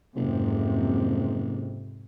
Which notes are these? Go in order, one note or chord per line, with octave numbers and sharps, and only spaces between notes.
F#1 F2 G#2 C3